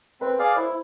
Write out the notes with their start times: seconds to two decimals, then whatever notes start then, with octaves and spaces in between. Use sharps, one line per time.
0.21 C4 B4
0.39 G#4 D5 F5
0.56 E4 C5